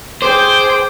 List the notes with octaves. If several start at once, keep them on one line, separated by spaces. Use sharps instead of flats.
G#4 C5 G5 D6